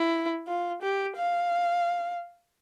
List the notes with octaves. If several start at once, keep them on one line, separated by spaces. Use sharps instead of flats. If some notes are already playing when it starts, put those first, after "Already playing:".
Already playing: E4
F4
G4
F5